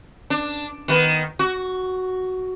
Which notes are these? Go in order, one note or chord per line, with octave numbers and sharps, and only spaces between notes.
D4
D#3 B3
F#4